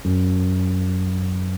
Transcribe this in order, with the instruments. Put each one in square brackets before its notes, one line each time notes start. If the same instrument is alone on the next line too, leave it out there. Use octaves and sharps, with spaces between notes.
[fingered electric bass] F#2